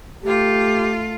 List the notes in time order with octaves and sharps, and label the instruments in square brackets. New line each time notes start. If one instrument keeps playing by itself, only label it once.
[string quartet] A3 F4 [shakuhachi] G4